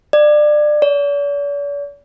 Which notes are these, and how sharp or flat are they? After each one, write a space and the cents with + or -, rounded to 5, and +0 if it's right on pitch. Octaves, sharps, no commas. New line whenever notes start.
D5 +25
D5 -45